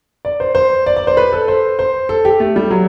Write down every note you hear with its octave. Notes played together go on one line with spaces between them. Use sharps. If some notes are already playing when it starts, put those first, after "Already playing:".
D5
C5
C5
D5
D5
C5
B4
A4
C5
C5
A4
G4
A3
G3
F#3